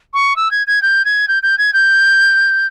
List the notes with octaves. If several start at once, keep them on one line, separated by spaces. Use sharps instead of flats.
C#6
E6
G#6
G#6
G6
G#6
G6
G6
G#6
G6